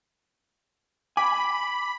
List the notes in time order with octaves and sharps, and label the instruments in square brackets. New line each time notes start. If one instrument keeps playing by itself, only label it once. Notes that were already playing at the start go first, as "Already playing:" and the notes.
[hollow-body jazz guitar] G#5 [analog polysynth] B5 [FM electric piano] D6